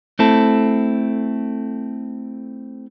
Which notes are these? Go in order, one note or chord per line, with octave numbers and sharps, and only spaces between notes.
A3 C4 E4 A4